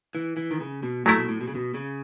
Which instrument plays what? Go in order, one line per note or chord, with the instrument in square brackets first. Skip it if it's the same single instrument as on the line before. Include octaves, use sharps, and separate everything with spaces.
[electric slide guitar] E3
E3
D#3
C#3
B2
[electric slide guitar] A2 [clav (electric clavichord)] F#3 A3 E4
[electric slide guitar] B2
A2
B2
C#3
B2
C#3